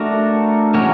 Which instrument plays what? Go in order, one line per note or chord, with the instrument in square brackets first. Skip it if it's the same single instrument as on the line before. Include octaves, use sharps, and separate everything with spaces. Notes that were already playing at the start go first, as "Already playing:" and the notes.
Already playing: [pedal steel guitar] A3 D4 F#4 A#4
E3 G#3 C#4 F#4 A#4